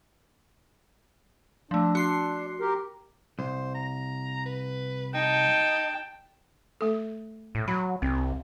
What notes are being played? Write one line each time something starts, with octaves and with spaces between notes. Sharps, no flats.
F3 A3 D4
F#4 C6 C7
G4 A#4
C2 C5
A#5
B4
D#4 G5 A5
A3 A4
A2
F#3 B5
C2 C4